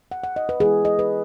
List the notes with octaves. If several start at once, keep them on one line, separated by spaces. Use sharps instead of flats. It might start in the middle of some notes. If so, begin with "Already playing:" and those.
F#5
F#5
D#5
B4
E3 G#3 B3 E4 G#4
D#5
B4